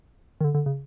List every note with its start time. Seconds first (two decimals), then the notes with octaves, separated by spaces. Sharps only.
0.41 D#3
0.44 D3
0.54 D3
0.66 C#3